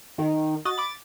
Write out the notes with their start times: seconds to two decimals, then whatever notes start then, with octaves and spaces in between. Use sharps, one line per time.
0.18 D#3
0.65 F#4 D#5 A6
0.78 B5 D6